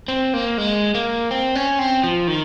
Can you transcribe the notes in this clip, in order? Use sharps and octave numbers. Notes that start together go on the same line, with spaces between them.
C4
A#3
G#3
A#3
C4
C#4
C4
F3
D#3